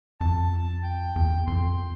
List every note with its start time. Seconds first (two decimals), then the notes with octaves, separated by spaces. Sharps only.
0.21 F2 A5
0.84 G5
1.16 E2
1.47 F2 C6